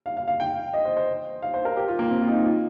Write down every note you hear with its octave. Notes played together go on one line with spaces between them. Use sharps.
F5
F5
F5
G5
D#5
C5
C5
F5
C5
A#4
G4
F4
A#3
C4
F4
D#4
F4